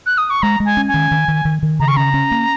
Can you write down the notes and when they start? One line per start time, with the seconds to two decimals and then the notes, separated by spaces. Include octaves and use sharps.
0.06 F#6
0.18 D#6
0.30 C#6
0.42 G#3 A#5
0.60 G#3
0.65 G#5
0.77 C#4
0.88 G#5
0.94 D#3
1.11 D#3
1.28 D#3
1.45 D#3
1.62 D#3
1.79 C#3 A#5
1.88 C#6
1.96 C#4 A#5
2.14 C#4
2.31 A#3